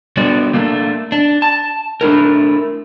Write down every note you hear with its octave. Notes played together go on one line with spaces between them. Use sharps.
D3 G3 B3 F#4 D5
A3 A#3 D4
D4
A5
A3 D4 E4 A#4